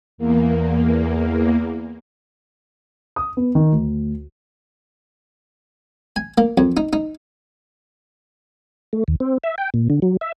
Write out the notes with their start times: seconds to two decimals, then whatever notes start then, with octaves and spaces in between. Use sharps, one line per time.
0.18 E2 A#3
3.16 D#6
3.37 B3
3.55 D#3
3.72 D2
6.16 G#5
6.38 A#3
6.58 F2
6.77 D#4
6.93 D#4
8.93 A3
9.08 D#2
9.20 C4
9.44 E5
9.58 G5
9.74 A#2
9.90 D3
10.02 F#3
10.21 E5